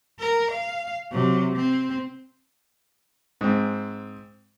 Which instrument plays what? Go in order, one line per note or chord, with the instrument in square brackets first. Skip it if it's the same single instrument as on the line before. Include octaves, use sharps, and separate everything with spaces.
[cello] A#4
F5
C3 F#3
C4
[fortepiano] G#2 C4